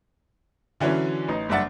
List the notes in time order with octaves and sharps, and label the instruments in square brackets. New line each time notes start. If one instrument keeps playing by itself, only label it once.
[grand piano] D3 E3 F#3 C#4 E4
A1 D#4
F#1 G2 D4 E5 F#5 A6